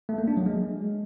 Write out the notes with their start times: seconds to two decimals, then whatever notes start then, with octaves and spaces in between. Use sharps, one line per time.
0.09 A3
0.18 A#3
0.28 D4
0.37 F#3
0.46 G#3